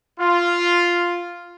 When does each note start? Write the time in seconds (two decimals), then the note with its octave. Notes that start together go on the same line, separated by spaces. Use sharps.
0.20 F4